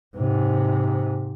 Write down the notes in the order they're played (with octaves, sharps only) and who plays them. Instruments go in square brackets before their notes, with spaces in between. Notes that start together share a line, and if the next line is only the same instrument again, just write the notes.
[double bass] G#2 C3